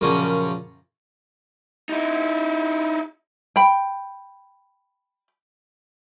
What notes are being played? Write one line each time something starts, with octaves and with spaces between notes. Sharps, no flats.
F#2 A#2 C#3 F3 C#4
D#4 E4
G5 B5